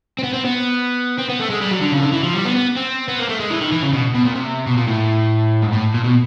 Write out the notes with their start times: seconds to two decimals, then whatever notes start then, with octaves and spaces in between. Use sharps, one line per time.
0.19 C4
0.23 B3
0.33 C4
0.45 B3
1.18 C4
1.29 B3
1.40 A3
1.50 G#3
1.61 G3
1.71 F#3
1.81 D3
1.92 C#3
1.99 D#3
2.03 D3
2.13 E3
2.24 F3
2.34 G3
2.45 B3
2.56 B3
2.77 C4
3.09 B3
3.19 A#3
3.29 A3
3.40 G#3
3.51 E3
3.61 D#3
3.72 E3
3.82 C#3
3.93 B2
4.14 B2
4.25 A#2
4.35 C3
4.67 B2
4.78 A#2
4.88 A2
5.63 G#2
5.73 A2
5.94 A#2
6.04 B2